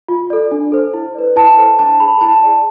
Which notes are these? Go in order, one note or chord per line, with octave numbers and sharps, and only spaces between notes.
F4
A4 D5
D4
A4 C5
E4
B4 D5
E4 A5
A4 C5
D4 A5
G#4 C5 B5
E4 A5
G#4 D5